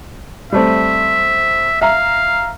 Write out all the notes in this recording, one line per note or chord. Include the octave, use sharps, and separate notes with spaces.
G3 A3 C4 E5
E5 F5 A#5